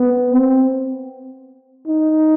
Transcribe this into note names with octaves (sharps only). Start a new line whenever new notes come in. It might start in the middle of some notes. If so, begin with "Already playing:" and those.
Already playing: B3
C4
D#4